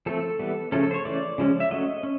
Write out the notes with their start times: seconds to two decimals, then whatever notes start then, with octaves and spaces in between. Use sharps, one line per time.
0.06 F3 A3 C4 A4
0.39 E3 G3 B3
0.72 C#3 F3 A3 C#4 A4
0.83 A4
0.91 C5
0.94 C#5
1.05 E3 A3 C#4 D5
1.38 C#3 F3 G#3 C#4
1.60 E5
1.71 F#3 A3 C#4 D#5
2.03 C#4